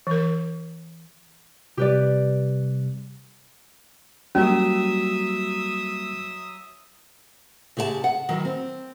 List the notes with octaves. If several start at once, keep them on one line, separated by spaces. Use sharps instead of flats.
E3 A#4
C3 G3 G4 B4 D5
F#3 G3 A#3 C#4 E5 D#6
C#3 G4 G#4 D#5 A5
F#5
D#3 E3 F#3
C4